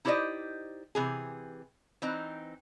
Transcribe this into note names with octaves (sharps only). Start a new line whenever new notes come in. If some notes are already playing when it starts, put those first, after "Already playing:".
D#4 E4 G4 C5 D5 D#5
C3 E3 G#4
E3 C4 D#4